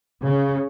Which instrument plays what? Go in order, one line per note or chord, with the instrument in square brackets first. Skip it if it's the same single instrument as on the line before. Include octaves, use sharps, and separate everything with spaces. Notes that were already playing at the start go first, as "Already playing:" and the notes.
[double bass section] C#3